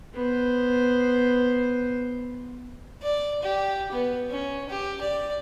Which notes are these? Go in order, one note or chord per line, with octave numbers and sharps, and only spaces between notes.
B3 C5
D5
G4
B3
C#4
G4
D5